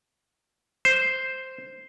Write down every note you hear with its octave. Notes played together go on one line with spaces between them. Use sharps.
C5